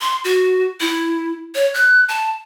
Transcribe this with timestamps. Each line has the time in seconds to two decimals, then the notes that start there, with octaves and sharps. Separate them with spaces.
0.01 C6
0.24 F#4
0.80 E4
1.55 C#5
1.74 F#6
2.08 A5